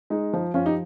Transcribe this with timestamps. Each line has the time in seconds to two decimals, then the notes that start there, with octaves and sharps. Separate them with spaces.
0.10 G#3 D#4
0.33 F3
0.54 F3 C#4 F4
0.65 D#4 G4